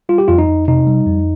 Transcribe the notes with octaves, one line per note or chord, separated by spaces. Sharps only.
G3 F4
G4
F2 F4
D#4
F2
C3 D#4
G3
F2